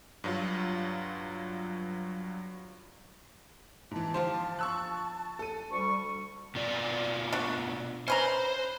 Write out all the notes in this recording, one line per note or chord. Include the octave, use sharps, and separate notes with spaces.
G2 F#3 F4
G#2 E3 A5
F3 F4 G4 C5
C#6 E6 F#6
A4 D#7
D2 G3 C#6
B2 F4 D5
D4 F#4
C#4 B4 C5 A#5